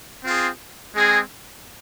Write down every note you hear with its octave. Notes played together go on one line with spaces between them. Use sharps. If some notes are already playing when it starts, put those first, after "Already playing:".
C4 F4 G#4
G#3 C4 G#4